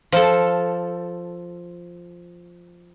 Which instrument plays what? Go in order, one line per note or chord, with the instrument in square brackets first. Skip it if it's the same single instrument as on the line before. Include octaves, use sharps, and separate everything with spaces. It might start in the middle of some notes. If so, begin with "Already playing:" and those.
[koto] F3 A4